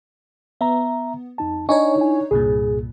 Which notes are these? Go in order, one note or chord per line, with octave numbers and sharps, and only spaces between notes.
B3 E5 A#5
F2 D#4 A5
D4 D#4 C#5 D#5 G#5 C#6
E4 G#5
C2 G2 A#2 G#4